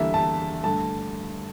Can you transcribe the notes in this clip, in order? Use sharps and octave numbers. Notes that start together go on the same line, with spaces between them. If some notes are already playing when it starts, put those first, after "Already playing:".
Already playing: E2 D3 G3 A#3 E5
A5
G2 D3 A3 A5